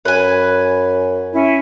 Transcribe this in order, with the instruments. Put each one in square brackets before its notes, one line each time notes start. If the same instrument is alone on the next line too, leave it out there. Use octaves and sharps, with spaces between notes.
[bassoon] F#2 [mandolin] B4 G#5
[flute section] C#4 E4